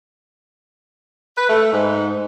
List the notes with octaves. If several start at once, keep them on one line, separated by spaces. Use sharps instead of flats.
B4
A3
G#2